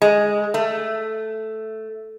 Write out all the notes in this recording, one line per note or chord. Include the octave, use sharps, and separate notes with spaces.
G#3
A3